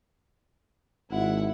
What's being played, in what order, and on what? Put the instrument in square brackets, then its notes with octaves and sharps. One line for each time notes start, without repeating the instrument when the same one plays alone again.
[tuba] G#1 [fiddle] E4 F#5